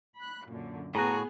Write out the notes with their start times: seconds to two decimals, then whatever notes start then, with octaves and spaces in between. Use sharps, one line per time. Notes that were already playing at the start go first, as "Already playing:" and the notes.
0.18 B5 F#6
0.47 F#2 A#2 D3
0.95 A2 B3 F#4 G#4 A#5